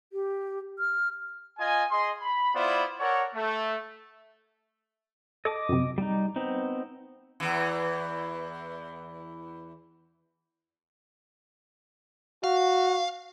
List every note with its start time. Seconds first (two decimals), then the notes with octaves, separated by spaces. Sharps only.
0.13 G4
0.79 F6
1.59 F4 D#5 G#5
1.91 G#4 D#5 C6
2.20 B5
2.54 B3 E4 F4 C5 D5
3.00 A4 A#4 C#5 D5 F#5
3.34 A3
5.45 A4 D#5 D6
5.69 F#2 C3
5.98 G3 D#4
6.36 B3 C4 D#4
7.40 E2 E3
12.44 F#4 F5